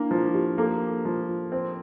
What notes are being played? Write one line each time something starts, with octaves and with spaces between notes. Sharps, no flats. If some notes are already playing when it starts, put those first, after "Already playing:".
Already playing: A#3 D4 E4
F3 E4
G4
A#3 A4
F3
C4